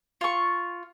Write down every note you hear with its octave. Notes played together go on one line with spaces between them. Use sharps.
F4 C#6